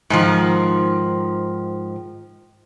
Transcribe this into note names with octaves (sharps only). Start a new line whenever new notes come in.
G#2 D#3 F3